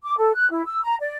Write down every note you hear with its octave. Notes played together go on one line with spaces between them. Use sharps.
D6
A4
F#6
E4
E6
A#5
D5